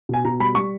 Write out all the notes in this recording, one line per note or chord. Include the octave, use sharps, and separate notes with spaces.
B2 G#5
B2 A#5
G3 B5
G3 C#6